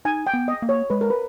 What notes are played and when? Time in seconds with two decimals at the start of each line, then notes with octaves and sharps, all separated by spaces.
0.05 D#4 G#5
0.27 G5
0.34 B3
0.48 D#5
0.62 A#3
0.69 C#5
0.90 G#3 B4
1.01 A#4
1.10 B4